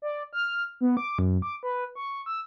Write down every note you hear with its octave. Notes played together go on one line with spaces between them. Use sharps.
D5
F6
B3
D6
F#2
D6
B4
C#6
E6